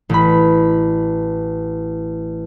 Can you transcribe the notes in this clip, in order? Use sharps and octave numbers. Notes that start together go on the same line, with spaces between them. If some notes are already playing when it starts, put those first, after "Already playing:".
A1 B5